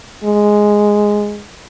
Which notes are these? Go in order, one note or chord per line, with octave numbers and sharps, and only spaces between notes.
G#3